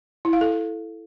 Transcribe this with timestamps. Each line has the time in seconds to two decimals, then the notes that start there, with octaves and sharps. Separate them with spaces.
0.25 E4
0.33 F5
0.41 A4